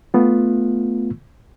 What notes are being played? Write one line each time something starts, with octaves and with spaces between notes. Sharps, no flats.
A3 B3 F4